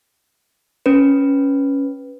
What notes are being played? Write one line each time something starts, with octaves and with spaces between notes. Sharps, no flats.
C#4 B4